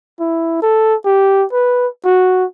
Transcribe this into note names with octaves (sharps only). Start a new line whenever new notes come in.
E4
A4
G4
B4
F#4